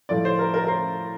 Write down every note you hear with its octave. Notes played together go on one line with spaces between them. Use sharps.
A2 F3 A3 D5
C5
A#4
A#4
A#4
C5